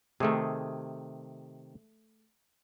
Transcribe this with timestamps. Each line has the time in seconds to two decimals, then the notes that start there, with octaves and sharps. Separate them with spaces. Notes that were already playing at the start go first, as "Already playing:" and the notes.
0.20 C3 D#3 A3 G#4